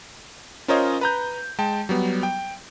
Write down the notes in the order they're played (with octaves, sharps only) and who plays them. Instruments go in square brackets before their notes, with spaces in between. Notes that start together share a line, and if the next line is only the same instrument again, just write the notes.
[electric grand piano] C#4 F4 A#4 C5 C#5 D#5
B4 A#5 G6
G#3 G5 A5
F#3 G3 B3
G5